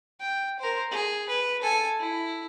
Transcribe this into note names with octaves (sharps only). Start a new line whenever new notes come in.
G5
A#4 C5
G#4
B4
A4 G#5
E4